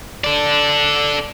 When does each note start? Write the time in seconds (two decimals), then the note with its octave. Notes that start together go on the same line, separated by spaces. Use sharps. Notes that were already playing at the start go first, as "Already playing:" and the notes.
0.24 A4 D5